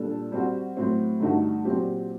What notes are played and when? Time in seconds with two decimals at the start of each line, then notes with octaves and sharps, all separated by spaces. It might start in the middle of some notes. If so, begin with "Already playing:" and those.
Already playing: A#2 G3 D4 A4
0.32 G3 C4 F#4
0.77 A2 F#3 C4
1.20 G2 D3 A3 D#4 F#4
1.65 A#2 F#3 C4 G4